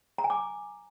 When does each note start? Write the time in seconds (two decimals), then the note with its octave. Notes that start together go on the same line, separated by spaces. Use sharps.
0.18 A#5
0.24 G#5
0.30 D6